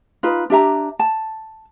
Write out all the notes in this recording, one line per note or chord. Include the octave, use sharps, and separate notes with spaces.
D#4 F4 B4
D4 G4 E5 A#5
A5